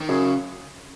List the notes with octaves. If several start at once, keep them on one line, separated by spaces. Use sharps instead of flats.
D#3
F#2 C#3